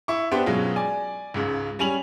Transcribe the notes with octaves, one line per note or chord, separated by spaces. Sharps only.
E4 C#6
B3 D4 G4 C5 E5
B2 F#3 G#3 C#4 F4
D5 G#5
C#2 G#2 C#3
G3 C#4 G#5 F7 F#7